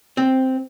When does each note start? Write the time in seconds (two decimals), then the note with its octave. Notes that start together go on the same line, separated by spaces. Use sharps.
0.17 C4